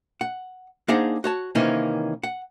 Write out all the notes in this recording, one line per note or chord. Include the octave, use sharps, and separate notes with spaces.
F#5
A#3 D4 D#4 G#4 C5 F#5
F#4 C#5 A5
C3 D#3 E3 A#3 C#4 D#4
F#5